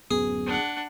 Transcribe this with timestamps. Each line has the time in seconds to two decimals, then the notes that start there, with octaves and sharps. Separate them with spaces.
0.11 D1 F#2 B3 G#4
0.46 D4 F#5